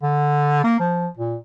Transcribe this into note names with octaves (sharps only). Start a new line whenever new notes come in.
D3
A#3
F3
A#2